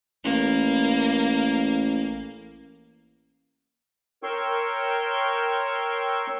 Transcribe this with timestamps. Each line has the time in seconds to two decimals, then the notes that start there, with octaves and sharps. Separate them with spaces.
0.24 A1 A#3
4.23 A#4 C#5 G5 C6 C#6 E6